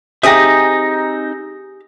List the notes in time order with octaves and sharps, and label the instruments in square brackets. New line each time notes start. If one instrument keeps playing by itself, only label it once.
[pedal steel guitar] C4 D#4 [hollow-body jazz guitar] G4 G#4 E5 [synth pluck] D#6 A#6